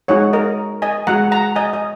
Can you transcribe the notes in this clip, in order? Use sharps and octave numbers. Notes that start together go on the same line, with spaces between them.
G#3 D#4 F#4 C#5 F#5
A#4 D#5
D#5 G#5
G#3 F#4 F#5 A#5
F#5 A#5
D#5 G#5
D#5